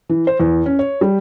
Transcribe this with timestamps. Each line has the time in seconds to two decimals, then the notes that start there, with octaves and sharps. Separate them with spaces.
0.09 E3
0.27 C5
0.40 E2
0.66 C#4
0.79 C#5
1.01 G3